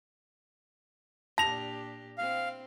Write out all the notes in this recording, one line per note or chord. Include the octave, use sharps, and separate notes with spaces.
A#2 D4 G4 A5 A#6 F7
C4 E4 F5